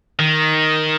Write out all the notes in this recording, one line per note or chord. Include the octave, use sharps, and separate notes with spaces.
D#3